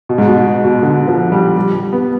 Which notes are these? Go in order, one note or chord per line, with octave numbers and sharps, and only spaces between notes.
B2
G#2
B2
B2
B2
D3
F3
G3
G3
G3
B3